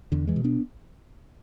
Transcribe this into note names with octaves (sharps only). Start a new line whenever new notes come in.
E2 D3
E3 G#3
B2
B3 D4